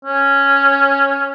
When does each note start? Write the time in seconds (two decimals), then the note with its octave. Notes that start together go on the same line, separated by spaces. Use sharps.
0.05 C#4